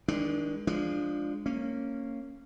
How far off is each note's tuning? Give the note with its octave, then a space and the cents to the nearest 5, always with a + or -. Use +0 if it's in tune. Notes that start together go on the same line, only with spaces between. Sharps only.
D#3 +35 G#3 +0 D4 +0
F3 +0 G#3 +0 D4 +5
A#3 -15 C#4 -10